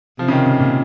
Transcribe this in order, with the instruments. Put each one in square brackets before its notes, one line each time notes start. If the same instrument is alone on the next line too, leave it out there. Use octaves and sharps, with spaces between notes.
[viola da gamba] C3 [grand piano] F3
[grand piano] C#3
D#3
C#3
A#2